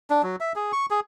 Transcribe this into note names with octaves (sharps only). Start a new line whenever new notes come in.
D4
F#3
E5
G#4
C#6
G#4